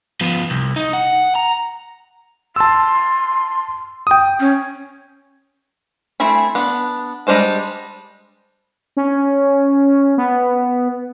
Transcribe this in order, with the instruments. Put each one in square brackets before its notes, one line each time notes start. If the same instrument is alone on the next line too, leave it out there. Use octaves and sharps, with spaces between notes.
[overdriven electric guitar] F3 B3
C2
D#4
F#5
A#5
[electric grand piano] A5 E6 [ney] C6
[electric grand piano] G5 D#6
[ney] C#4
[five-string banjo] A3 C4 E4 G#5 B5
B3 D4
G3 G#3 D4 C5 A5
[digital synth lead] C#4
B3